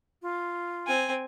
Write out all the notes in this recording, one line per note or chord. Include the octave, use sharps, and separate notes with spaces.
F4
C4 G#5